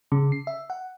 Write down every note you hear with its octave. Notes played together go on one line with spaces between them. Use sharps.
C#3
C7
E5
F#5